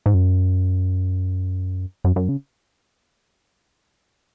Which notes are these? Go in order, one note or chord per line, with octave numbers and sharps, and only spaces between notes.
G#2
F#2
F#2
F#2
C#3